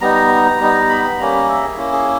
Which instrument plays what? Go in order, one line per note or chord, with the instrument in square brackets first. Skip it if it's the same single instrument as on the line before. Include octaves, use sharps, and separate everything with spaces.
[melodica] G3 B3 D#4 A#5
A#5
G3 B3 D#4
B5
B5
G3 A#3 C#4 A#5
E5
G#4
A#3 C#4 E4
G#4